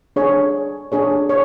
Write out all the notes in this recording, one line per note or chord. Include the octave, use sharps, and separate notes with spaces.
D4 G#4 C#5
D4 G#4 C#5
C#5